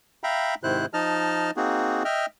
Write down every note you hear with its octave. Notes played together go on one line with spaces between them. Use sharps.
E5 F5 G5 A#5 B5
G#2 C3 D#3 E4 C5 F#6
F3 D#4 D#5 A5 F6
A#3 C4 D#4 F#4 G#4
D#5 E5 G5 F6